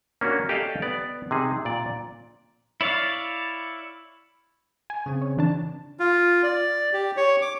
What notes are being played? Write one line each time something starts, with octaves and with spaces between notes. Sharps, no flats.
A#3 C#4 D4 F#4
G4 A4 D5 D#5 F5
B3 D5
C3 D#4 G#4
A#2 D5
E4 C#5 D5 F5
G#5
C#3 C4
C#5
E3 D4 A5
F4
D5
G4
C#5
D6